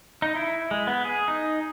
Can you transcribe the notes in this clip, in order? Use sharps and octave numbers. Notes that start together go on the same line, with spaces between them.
D#4
E4
G#3
B3
G#4
D#4